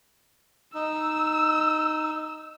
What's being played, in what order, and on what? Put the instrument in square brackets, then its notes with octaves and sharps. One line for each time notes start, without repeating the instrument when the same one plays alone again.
[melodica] D#4 [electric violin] E6